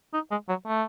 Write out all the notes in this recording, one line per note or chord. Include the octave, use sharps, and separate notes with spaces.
D#4
G#3
F#3
A3